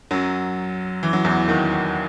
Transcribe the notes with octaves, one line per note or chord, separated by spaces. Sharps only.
F#2 F#3
E3
F#3
E2 E3
D#2 D#3